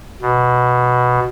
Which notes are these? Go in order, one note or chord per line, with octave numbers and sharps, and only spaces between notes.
B2